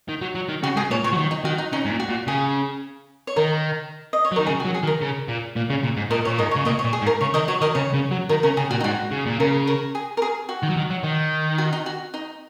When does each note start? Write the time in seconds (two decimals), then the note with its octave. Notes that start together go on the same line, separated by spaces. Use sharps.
0.09 D#3
0.22 F#3
0.35 F#3
0.49 D#3
0.63 C#3 F#4
0.76 G#2 G#4
0.91 A#2 C#5
1.04 A#2 C#5
1.13 F#3
1.18 D#3
1.31 D#4
1.45 D#3 F#4
1.58 D#4
1.73 C#3 D#4
1.85 G#2
1.90 A#2
2.00 F#4
2.09 A#2
2.27 C#3 G#4
3.27 C#5
3.36 D#3 A#4
4.13 D#5
4.25 C#5
4.32 F#3
4.36 D#3 A#4
4.46 C#3 G#4
4.60 F#4
4.65 F#3
4.74 G#4
4.83 D#3
4.87 A#4
5.02 C#3
5.28 A#2
5.56 A#2
5.70 C#3
5.84 A#2
5.97 G#2
6.10 A#2 A#4 D#5
6.25 A#2 C#5
6.38 G#2 A#4 D#5
6.51 C#5
6.56 C#3
6.65 A#2 A#4 D#5
6.79 C#5
6.85 A#2
6.93 G#4
7.02 G#2
7.06 A#4
7.21 C#3 C#5
7.34 D#3 A#4 D#5
7.48 F#3 C#5
7.61 D#3 A#4 D#5
7.75 C#3 C#5
7.94 C#3
8.11 F#3
8.29 D#3 A#4
8.43 C#3 A#4
8.57 C#3 G#4
8.71 A#2 F#4
8.80 D#4
8.84 G#2 F#4
9.12 C#3
9.26 A#2
9.39 C#3 A#4
9.67 A#4
9.95 G#4
10.17 A#4
10.22 G#4
10.49 F#4
10.63 D#3
10.70 F#3
10.77 D#3
10.91 F#3
11.04 D#3
11.58 F#4
11.73 D#4
11.86 F#4
12.14 D#4